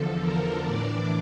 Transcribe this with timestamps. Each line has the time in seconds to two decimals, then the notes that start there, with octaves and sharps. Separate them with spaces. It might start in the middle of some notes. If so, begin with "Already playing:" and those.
Already playing: E2 D3 F3 A4
0.21 A#4
0.65 A2 E3 D4 D5